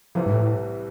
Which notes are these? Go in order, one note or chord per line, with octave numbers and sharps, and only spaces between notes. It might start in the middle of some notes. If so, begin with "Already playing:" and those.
C2 C3 E3 F3
G2
A2